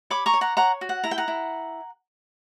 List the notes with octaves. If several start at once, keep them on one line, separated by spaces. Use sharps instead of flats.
C#5 B5 D6
A#5 C#6
C#5
F#5 A#5
C#5 F#5 A#5
F#4
F#5
E4 A#5
G5
F#5 A#5
E4